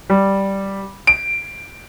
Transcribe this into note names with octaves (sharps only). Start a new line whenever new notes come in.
G3
D7